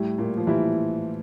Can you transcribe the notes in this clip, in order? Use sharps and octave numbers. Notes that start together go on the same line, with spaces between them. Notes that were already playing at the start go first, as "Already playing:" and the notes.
Already playing: A2 G3 E4
A#2 A#3
F3
E3 G3 E4